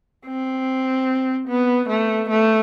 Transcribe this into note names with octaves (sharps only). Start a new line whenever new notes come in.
C4
B3
A3
A3